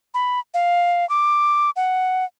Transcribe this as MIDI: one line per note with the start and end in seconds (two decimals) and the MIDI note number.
0.14 0.40 83
0.54 1.08 77
1.09 1.70 86
1.76 2.25 78